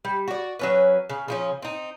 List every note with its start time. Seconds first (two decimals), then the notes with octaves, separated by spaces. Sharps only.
0.05 G3
0.28 F#4 D5
0.59 F#3 C#4 B4
1.10 C#3
1.28 C#3 F3 C#4
1.62 C4 D#4